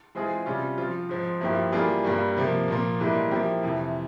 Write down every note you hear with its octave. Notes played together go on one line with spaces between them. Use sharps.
E3 G#3 C4 F4 G#4
C3 G3 C#4 F4
F3 C4 F4
G#2 F3 C4
G2 F3 A#3 E4 G4
E3 G3 A#3 F4 G#4
G2 G3 A#3
C3 F3 A#3
A#2 F3 A#3
G#2 E3 G3 A#3 E4
F3 A#3 E4 G4
F2 C3 E3